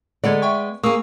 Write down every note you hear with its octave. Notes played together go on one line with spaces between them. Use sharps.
D3 G#3 B3 A4 D5 G#6
E5 G5 C#6
A#3 G#4 C#6 D#6 E6